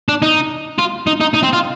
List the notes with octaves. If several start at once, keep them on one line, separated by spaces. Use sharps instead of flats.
D4
D#4
F4
D#4
D#4
D#4
C4
F4